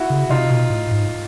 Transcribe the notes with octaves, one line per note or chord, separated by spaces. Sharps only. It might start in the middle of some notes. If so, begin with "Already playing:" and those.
Already playing: E4 F#4
C#3
C3 D#4 F4
B2
A2
G#2